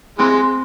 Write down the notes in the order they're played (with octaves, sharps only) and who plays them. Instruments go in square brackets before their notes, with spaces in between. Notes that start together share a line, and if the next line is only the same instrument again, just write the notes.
[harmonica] C3 E3 G#3 [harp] C4